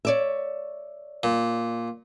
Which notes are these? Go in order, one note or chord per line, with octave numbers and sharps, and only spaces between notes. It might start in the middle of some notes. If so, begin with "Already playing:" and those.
C#5 D5 E5
A#2